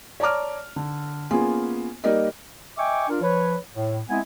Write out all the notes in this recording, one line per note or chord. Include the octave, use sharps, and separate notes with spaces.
C#5 D5 A5 A#5 D6 F6
D3
A#3 B3 C#4 F4 G#4 G#5
G3 A#3 D#4 A#4 D5 D#5
D#5 E5 G5 G#5 C#6 D6
D4 F4 A#4
F3 B4 C#5
A2
G#3 B3 C4 E4 D#5 G#5